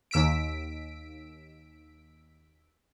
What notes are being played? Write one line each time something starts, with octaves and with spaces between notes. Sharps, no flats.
D#2 E6 B6 D7